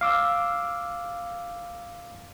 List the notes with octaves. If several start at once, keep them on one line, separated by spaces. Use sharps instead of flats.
F5 D6 E6